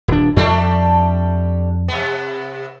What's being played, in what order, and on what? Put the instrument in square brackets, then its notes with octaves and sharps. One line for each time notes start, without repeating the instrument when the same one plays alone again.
[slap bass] D#1 D4
[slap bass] F2 [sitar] G3 A3 D4
[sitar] C3 B3